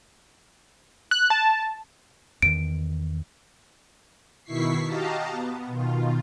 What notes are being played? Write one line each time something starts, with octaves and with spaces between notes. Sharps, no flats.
F#6
A5
E2 D#3 D7
B2 D#3 E4 C#6 B6 C7
F#4 G4 D#5 F5 A5 A#5
B3
B2 D#3 F4